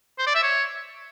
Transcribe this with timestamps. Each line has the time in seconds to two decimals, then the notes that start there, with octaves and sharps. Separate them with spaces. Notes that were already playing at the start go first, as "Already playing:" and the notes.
0.19 C5
0.27 D5
0.35 E5
0.43 C#5